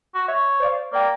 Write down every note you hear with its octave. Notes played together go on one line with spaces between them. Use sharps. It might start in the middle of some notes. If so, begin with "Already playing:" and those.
F#4
C#5 E5
C5 D5 F5
A#3 D5 G5